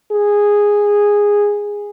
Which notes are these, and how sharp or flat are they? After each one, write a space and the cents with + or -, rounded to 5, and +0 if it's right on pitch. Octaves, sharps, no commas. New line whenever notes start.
G#4 -10